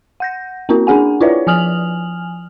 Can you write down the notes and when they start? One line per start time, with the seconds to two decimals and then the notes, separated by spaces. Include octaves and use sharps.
0.20 F#5 G6 A#6
0.69 A#3 C4 C#4 E4 F#4 A#4
0.87 C#4 D4 G#4 F#5 G#5
1.21 E4 F4 B4 C#5 D5 E5
1.47 F3 G#5 D#6 F6 F7 F#7